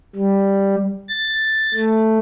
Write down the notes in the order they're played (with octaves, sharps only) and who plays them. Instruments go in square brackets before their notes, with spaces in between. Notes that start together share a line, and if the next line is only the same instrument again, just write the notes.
[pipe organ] G3
A6
A3